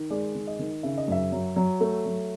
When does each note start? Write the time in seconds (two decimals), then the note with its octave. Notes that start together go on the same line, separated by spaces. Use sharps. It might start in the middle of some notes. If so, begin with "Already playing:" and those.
Already playing: D#3
0.10 G#3 D5
0.35 D#3
0.47 D#5
0.59 D#3
0.83 C#3 E5
0.98 D#5
1.08 F#2 E5
1.32 F#3
1.56 F#3
1.80 A3
2.06 F#3